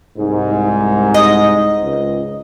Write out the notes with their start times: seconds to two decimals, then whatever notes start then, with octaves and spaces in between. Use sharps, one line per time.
0.18 C2 G#2
1.14 D#5
1.83 C#2